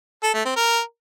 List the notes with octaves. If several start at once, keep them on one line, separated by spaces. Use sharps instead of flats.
A4
A3
C4
A#4